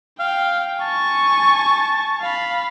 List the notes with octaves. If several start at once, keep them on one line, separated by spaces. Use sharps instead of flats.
F5 G5
G#5 A5 C#6
F5 B5